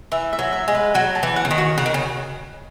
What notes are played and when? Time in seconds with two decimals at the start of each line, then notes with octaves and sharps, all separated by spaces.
0.12 E3 E5
0.33 E5
0.39 F#3
0.53 E5
0.68 G#3
0.75 B4
0.94 F#3 F#4
1.15 A5
1.23 E3
1.36 F#5
1.45 C#3
1.51 D#3
1.58 F#4
1.77 C#3 F#5
1.86 D#3
1.94 C#3